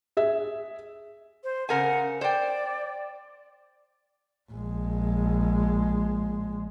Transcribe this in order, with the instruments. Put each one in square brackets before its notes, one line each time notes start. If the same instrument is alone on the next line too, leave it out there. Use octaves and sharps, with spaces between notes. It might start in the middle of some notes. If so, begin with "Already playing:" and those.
[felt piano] G#4 E5
[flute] C5
[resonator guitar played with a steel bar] C#3 A#4 G#5 [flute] F#5
[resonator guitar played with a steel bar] C5 G5 [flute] D5
[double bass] A#1 G#3